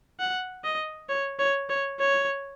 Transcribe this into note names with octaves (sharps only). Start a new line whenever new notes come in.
F#5
D#5
C#5
C#5
C#5
C#5